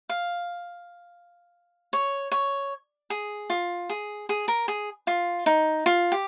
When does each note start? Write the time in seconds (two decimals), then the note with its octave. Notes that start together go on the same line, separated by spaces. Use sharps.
0.09 F5
1.93 C#5
2.31 C#5
3.10 G#4
3.50 F4
3.90 G#4
4.29 G#4
4.48 A#4
4.68 G#4
5.07 F4
5.46 D#4
5.86 F4
6.12 G4